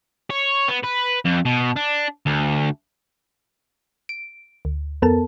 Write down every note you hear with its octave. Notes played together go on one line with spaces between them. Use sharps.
C#5
B3
B4
F2
B2
D4
D2
D7
D2
F2 B3 A4 A#4 A5